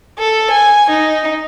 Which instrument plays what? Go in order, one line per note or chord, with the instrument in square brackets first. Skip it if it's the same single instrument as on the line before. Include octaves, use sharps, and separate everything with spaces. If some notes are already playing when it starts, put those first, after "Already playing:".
[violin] A4
G#5
D#4